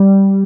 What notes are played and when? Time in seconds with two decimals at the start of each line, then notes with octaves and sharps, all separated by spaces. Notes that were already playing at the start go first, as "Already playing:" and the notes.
Already playing: G3